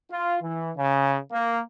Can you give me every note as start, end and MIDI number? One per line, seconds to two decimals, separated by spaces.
0.11 0.36 65
0.42 0.70 52
0.77 1.17 49
1.31 1.60 58